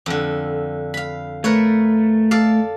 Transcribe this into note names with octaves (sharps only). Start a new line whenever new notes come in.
F2 D3
F5 B5
A3 A#4 B4 C#5
A4 D5 F5